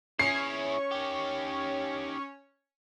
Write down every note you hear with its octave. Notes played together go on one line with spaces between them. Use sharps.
C#4 E4 G#4 C#5 C7
D#3 G4